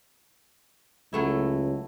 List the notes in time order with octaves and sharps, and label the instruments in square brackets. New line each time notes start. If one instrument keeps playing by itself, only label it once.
[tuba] C#2 [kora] F#3 A3 E4